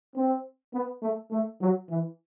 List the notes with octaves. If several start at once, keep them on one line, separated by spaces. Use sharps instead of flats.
C4
B3
A3
A3
F#3
E3